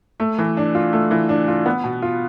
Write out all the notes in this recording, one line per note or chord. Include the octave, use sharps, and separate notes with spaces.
A3
E3
D4
F4
A3
E3
D4
F4
B3
B2
F4